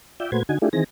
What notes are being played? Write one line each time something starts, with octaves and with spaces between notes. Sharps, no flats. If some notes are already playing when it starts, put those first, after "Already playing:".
F4 D5 E5 G5
A#2 A3 F#4 B4 C5 G#6
D3 D#4 F#4 G#5
A3 D4 E4 F4 G4 G#4
D#3 E3 C4 G#4 A#6